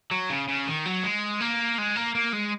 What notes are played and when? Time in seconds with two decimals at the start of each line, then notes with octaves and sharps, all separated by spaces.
0.11 F#3
0.29 C#3
0.48 C#3
0.67 D#3
0.86 F#3
1.03 G#3
1.40 A#3
1.78 G#3
1.96 A#3
2.15 A#3
2.33 G#3